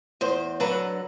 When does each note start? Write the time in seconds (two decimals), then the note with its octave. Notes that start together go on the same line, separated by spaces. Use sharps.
0.21 E2 C5
0.60 D3 F#3 B4